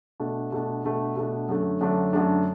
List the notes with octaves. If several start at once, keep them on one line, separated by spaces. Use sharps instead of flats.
B2 A3 D4
B2 A3 D4
B2 A3 D4
B2 A3 D4
F#2 D3 A3 D4
F#2 D3 A3 D4
F#2 D3 A3 D4